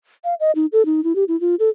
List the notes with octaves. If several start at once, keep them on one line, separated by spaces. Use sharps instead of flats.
F5
D#5
D#4
A4
D#4
E4
G4
E4
F4
A4